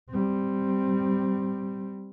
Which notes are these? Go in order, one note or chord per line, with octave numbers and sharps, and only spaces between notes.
G3 C4